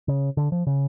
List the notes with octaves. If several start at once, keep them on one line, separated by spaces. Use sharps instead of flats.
C#3
D3
F3
C#3